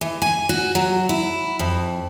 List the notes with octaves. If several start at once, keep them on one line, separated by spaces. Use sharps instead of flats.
E3
G#5
F#4
F#3
E4
F2